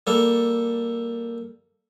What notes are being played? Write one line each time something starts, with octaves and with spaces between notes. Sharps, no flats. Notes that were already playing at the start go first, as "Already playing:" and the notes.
G3 A#3 A4